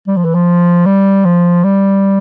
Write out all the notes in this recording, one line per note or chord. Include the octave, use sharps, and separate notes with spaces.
G3
F3
E3
F3
G3
F3
G3